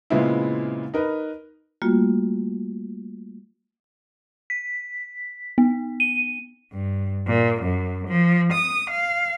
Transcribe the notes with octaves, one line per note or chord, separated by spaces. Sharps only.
A#2 C#3 G#3 B3 C4 E4
D#4 A#4 B4
G3 A3 A#3 F4 F#4
B6
B3
D#7
G2
A#2
F#2
F3
D#6
F5